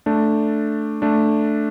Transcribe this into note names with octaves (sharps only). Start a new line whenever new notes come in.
A3 D4
A3 D4